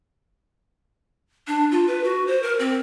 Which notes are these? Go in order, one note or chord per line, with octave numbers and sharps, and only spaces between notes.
D4
F4
B4
F#4
C5
A#4
C4